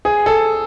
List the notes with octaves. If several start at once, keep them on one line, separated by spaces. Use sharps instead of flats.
G#4
A4